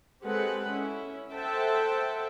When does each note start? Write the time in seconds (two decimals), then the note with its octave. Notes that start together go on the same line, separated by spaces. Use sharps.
0.23 G#3 C4 G4 A4 B4 F#5
0.69 C#4 E4
1.32 A4 C5 E5 F#5 G5 A5